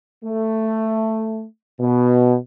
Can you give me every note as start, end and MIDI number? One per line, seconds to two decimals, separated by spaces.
0.25 1.44 57
1.81 2.36 47